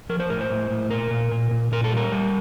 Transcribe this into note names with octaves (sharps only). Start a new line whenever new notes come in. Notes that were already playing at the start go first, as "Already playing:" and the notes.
F3 A#4
C5
A2 A#4
C5
A2
A2
A#2 A#4
A#2
A#2
A#2
A#2 A#4
A4
G3 A#4
G3